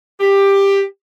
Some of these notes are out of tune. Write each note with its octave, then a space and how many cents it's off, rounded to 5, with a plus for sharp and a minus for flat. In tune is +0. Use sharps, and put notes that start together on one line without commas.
G4 +15